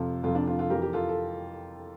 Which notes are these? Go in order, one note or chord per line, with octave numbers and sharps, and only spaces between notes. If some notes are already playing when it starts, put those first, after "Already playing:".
Already playing: F2 C3 F3 F4 A4
F2 C3 F3 F4 A4
D4 F4
D4 F4
F4 A4
F2 E3 G4 A#4
G4
F4 A4
A4